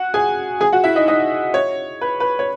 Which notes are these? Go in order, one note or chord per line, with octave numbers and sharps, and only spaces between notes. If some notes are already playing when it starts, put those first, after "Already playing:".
Already playing: F#4 F#5
G#4 G#5
G#4 G#5
F#4 F#5
E4 E5
D#4 D#5
D#4 D#5
C#5
B4
B4
C#5